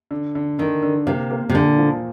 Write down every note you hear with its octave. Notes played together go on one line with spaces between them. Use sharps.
D3
D3
D3 D#3
D3
C3 A#3
A#3
C3
A#2 D3
F3